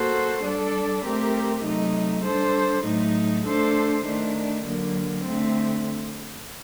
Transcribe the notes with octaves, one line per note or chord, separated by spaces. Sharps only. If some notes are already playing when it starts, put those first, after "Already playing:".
Already playing: A#3 F#4 A4 C5
G3 D4 A4 D5
A3 C4 G4 A#4
C3 F#3 A3 D#4
G3 D4 A4 C5
A2 F#3 A3 D#4
A3 D4 A4 C5
D#3 A3 D4
D3 F#3 A#3
D3 A3 C4